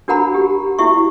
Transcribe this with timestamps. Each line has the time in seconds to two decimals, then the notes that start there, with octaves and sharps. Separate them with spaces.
0.08 D4 F#4 A#4 F#5 A#5 B5
0.34 G4
0.79 E4 F#4 E5 C#6